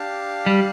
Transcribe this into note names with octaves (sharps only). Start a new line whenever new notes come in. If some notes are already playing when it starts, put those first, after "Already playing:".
Already playing: D4 G4 F5 A5
G3